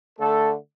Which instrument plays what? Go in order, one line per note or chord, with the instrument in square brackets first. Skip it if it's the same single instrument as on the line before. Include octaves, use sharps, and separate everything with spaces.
[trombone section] D3 A3 A4